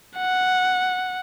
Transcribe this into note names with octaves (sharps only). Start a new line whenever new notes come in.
F#5